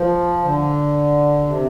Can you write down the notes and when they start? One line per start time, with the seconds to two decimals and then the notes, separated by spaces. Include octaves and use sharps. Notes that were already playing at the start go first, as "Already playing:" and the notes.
Already playing: F3
0.42 D3
1.46 C3